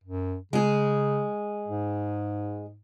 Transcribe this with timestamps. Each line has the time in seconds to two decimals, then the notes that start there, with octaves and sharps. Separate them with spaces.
0.04 F#2
0.53 C#3 G#3 G#4
1.68 G#2